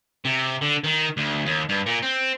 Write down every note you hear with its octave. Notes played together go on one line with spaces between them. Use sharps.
C3
D3
D#3
D2
D#2
G2
A#2
C4